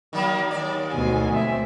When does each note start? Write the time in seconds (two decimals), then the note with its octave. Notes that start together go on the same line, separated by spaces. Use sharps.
0.13 D#3 F#3 A#3
0.51 D#2 D5
0.92 D2 B2 G#5
1.32 A3 C4 E5